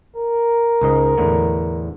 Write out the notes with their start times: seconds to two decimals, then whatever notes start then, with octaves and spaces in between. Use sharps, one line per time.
0.17 A#4
0.82 C#2 G#2 D#5
1.18 E2 A2 D3